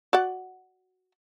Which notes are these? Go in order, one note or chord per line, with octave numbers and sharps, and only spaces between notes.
F#4 D5 F#5